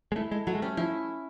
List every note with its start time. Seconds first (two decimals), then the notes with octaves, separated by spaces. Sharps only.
0.12 G#3
0.16 A3 E4
0.31 G#3 A4
0.47 F#3 A3
0.55 G#3
0.62 G3 C#4
0.77 F3 E4